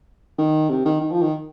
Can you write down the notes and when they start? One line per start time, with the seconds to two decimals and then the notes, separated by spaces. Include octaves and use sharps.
0.38 D#3
0.69 C3
0.85 D#3
1.01 D#3
1.11 F3
1.22 D#3